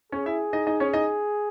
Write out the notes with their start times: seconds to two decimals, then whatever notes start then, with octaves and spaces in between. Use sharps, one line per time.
0.12 C#4 G#4 C#5
0.26 E4 E5
0.53 D#4 D#5
0.67 D#4 D#5
0.80 C#4 C#5
0.93 D#4 D#5